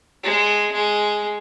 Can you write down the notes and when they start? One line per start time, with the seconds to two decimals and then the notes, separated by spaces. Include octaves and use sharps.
0.23 G#3
0.72 G#3